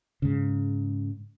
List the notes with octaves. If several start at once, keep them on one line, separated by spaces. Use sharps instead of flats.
G#2 C#3